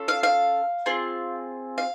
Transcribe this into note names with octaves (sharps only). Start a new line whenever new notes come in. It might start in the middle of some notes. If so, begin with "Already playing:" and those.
Already playing: C#4 F4 A4
F5
F5
C4 F4 G#4
F5